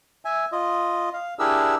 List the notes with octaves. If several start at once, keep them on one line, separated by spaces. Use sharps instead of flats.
E5 G#5
F4 D#5
F5
D4 E4 G4 G#4 A#4 E6